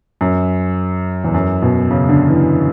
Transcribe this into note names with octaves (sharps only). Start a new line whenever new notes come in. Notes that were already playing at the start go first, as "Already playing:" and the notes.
F#2
E2
F#2
B2
C#3
D3
E3